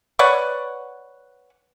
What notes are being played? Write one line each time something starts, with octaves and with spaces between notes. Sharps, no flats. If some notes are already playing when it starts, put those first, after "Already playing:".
B4 C#5 D5 F#5